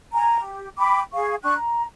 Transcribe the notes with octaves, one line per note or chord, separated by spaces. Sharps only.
G#5 A#5
G4
G5 B5 D6
G#4 F5 C#6
D4 G5 C#6 F#6
A#5